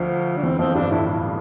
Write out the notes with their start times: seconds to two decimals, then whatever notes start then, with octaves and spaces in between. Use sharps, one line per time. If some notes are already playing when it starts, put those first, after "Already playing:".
Already playing: D2 F3
0.37 D4
0.43 E2 E3 C4
0.59 F2 F3 C4
0.75 G2 G3 D4
0.91 A2 A3 E4